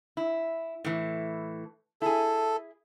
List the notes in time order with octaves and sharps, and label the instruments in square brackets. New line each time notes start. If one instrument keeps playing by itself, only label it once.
[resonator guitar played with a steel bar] E4
A2 E3
[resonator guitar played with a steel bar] E4 G#4 [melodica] A4